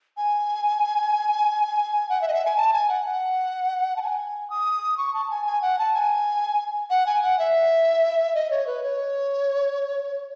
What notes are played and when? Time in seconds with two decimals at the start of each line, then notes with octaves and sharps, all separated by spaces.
0.17 G#5
2.09 F#5
2.21 E5
2.28 D#5
2.33 E5
2.45 G#5
2.57 A5
2.73 G#5
2.89 F#5
3.05 F#5
3.96 A5
4.02 G#5
4.50 D#6
4.97 C#6
5.14 A5
5.30 G#5
5.46 G#5
5.62 F#5
5.79 A5
5.94 G#5
6.90 F#5
7.06 G#5
7.22 F#5
7.39 E5
8.34 D#5
8.50 C#5
8.67 B4
8.83 C#5